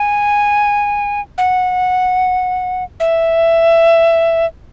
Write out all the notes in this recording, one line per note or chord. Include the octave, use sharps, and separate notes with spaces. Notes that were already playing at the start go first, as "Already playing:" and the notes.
Already playing: G#5
F#5
E5